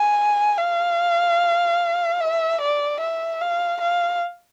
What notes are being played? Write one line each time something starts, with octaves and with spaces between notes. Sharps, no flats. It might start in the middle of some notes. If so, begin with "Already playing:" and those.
Already playing: G#5
F5
E5
D5
E5
F5
F5